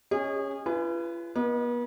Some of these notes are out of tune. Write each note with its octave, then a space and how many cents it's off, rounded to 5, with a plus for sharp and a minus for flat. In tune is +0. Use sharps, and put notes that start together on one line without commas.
C#4 +0 G#4 -35 D#5 +0
F4 -45 B4 +0 G#5 +0
B3 -40 D#5 +0